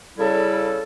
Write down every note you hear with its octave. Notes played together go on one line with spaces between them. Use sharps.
C#3 G3 E4 A4